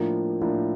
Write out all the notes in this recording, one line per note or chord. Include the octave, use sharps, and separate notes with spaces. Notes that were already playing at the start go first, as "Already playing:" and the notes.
Already playing: A2 F3 A#3 D4
A2 F3 A#3 D4